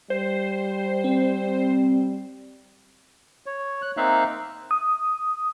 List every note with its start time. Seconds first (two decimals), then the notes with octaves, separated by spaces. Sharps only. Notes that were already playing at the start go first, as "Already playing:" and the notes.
0.10 G3 C5
1.04 C4
3.46 C#5
3.82 F#6
3.97 A#3 C4 D#4 E5 F5 F#6
4.71 D#6